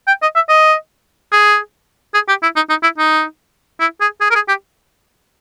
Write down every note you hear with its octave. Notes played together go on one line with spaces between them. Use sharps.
G5
D#5
E5
D#5
G#4
G#4
G4
E4
D#4
D#4
E4
D#4
E4
G#4
G#4
A#4
G#4
G4